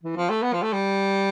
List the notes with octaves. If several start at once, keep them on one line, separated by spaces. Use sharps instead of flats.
E3
F3
A3
B3
F3
A3
G3